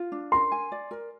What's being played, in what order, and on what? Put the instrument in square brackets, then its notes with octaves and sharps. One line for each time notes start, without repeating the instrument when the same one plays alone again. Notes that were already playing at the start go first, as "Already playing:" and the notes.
Already playing: [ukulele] F4
D4
[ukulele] A#4 [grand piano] C6
[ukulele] G#5
D5
A#4